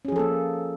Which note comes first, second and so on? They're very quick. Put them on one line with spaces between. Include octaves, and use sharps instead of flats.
C#4 G#4 F3 A4 A#3